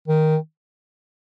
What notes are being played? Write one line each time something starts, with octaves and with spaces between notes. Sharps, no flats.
D#3